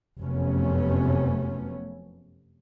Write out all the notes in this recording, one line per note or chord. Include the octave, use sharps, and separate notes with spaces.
F1 F#2 C3 A3 B3 C#4